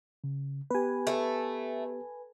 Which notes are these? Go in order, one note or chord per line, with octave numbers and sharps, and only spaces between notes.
C#3
B3 G4 B4 G#5
A3